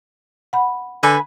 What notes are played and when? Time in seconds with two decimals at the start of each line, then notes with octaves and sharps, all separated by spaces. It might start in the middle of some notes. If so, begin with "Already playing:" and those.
0.53 F#5 B5
1.03 D3 B4 G#5 B5